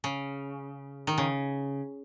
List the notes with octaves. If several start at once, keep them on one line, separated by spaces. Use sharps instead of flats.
C#3
D#3
C#3